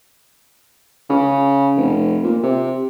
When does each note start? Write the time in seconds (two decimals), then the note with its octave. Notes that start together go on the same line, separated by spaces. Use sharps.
1.09 C#3
1.77 F1
2.23 A#2
2.43 C3